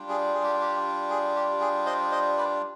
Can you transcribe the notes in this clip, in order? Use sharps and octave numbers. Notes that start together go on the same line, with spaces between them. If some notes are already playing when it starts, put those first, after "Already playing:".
Already playing: G3 D4 F4
G#4
G#4
G4
G4
G#4
G4
G#4
C5 D#5
C5 D#5
B4 D5